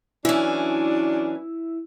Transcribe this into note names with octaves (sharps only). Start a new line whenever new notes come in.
E3 F#3 C#4 D4 E4